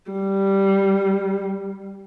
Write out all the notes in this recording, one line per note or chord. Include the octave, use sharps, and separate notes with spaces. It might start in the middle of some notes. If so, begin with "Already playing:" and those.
G3